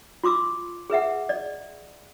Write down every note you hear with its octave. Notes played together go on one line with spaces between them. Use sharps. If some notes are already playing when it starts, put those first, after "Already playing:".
F4 C6 D6 E6
G#4 B4 E5 F#5
D5 D#5